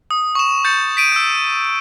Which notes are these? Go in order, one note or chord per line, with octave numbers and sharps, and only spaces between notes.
D#6
C#6 E7
G6 A6 C#7
B6 D7 D#7
E6 G6